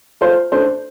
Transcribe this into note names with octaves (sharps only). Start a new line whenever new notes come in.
A3 F4 C5
A3 D4 A4 C5